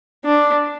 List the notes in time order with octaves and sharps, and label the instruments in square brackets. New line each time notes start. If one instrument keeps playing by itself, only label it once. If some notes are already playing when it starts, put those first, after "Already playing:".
[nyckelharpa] D4